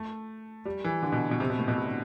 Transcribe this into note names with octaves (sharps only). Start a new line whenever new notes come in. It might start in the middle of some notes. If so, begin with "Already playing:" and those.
Already playing: A3
G3
E3
D3
B2
B2
C3
B2
A2
B2
C3
D3